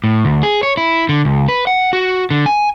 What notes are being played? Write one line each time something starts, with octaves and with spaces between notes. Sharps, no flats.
A2
D2
G#4
C#5
E4
D3
C#2
B4
F#5
F#4
D3
G#5